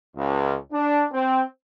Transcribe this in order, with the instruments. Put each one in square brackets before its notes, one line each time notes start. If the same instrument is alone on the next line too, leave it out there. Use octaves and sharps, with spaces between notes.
[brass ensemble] C#2
D4
C4